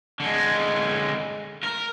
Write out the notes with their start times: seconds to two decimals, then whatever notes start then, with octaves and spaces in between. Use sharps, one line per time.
0.20 D3 G#3
1.63 A#4